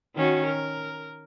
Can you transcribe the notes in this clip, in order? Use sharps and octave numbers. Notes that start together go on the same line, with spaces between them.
D#3 C#4 F#4
A#4